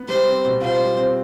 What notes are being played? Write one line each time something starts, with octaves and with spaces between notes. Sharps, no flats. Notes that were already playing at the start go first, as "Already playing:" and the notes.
Already playing: B3
G3 C5
C4
B2
F4 C5
G3
C4